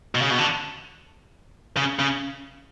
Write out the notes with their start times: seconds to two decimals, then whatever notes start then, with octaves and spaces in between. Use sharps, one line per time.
0.15 B2
0.22 C#3
0.30 B2
0.38 D3
1.77 C#3
1.99 C#3